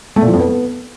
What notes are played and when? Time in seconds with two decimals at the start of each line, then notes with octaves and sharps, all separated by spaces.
0.16 A3
0.22 A#2
0.28 F3
0.34 F2
0.39 B3